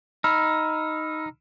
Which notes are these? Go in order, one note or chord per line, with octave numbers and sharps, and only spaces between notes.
D#4 B5 E6 F6